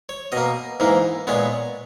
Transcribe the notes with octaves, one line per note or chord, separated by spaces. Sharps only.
C#5
B2 A#3 D#5
G#2 E3 A#3
A#2 G#3 B3 C#5